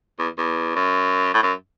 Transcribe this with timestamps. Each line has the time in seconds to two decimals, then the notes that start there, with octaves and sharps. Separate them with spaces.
0.19 E2
0.38 E2
0.76 F#2
1.34 A2
1.43 F#2